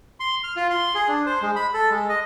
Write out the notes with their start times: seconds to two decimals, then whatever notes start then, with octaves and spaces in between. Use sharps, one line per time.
0.20 C6
0.44 F6
0.56 F4
0.70 C6
0.95 G#4
1.08 D4
1.26 C5
1.42 G#3
1.56 B5
1.74 A4
1.91 G#3
2.09 D#5